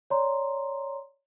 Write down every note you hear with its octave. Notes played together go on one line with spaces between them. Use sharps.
C#5 D5 A#5 C6